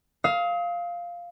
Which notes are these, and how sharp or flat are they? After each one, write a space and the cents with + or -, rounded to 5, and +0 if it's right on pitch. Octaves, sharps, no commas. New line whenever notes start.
F5 +0 D#6 +40